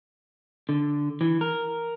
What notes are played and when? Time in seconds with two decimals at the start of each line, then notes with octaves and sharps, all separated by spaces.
0.69 D3
1.21 E3
1.41 A#4